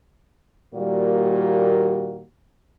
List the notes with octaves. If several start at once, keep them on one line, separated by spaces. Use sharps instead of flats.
A#2 D#3 G3 A#3 F#4